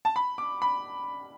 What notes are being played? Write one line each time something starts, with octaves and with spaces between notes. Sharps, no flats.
A5
B5
D6
B5